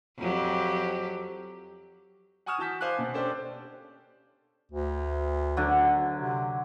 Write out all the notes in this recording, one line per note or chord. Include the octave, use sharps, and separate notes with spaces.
F2 F#3 G4
F#5 G#5 C#6 D#6 F6 E7
E3 F#4 A5 G6 B6
C5 F5 G#5 D6 F#6
B2 B3
C#4 D4 G4 A4 C5 D5
D2
D3 F#3
C3